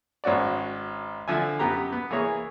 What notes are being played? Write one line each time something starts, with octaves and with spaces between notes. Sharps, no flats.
G#1 C#4 F#4 D5
D3 F3 E5 G#5
F#2 B3 G4 A#5
B3
E3 A#3 G#4 C#5